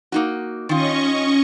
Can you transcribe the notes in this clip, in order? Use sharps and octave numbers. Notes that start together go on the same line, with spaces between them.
A#3 D#4 F#4
D#3 C#4 F4 D#5 C#6